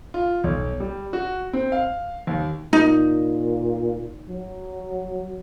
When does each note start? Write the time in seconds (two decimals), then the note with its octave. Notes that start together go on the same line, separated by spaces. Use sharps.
0.14 F4
0.44 B1
0.80 G3
1.13 F#4
1.53 C4
1.72 F5
2.27 D#2
2.73 A#2 D#4
4.30 F#3